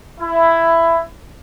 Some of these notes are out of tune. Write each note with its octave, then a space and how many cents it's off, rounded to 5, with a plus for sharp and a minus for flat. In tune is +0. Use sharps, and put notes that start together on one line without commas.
E4 +10